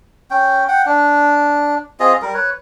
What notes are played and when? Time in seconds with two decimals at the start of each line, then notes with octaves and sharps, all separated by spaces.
0.31 C#4 G5
0.68 F#5 G5
0.86 D4
2.00 C4 F4 G#4 D#5
2.22 G3 A#4
2.34 B4 C#5